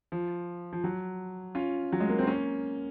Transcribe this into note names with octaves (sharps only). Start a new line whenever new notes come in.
F3
F3
F#3
C#4 F4
F#3
G#3
A#3
C4
A#3 C#4